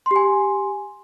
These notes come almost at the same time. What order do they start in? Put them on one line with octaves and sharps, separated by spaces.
C6 G4 G#5